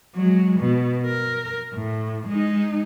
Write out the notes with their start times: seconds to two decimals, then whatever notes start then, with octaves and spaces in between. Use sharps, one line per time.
0.15 F#3 G#3
0.60 B2
1.06 A#4
1.73 A2
2.28 G#3 D#4